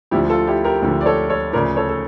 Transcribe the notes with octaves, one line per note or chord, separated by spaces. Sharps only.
D2 D3 F3 E4 G4
F4 A4
E4 G4
G4 A#4
D2 D3 F3
D5
A4 C#5
A4 C#5
D2 C#3 F3 A#4 D5
A4 C#5
A4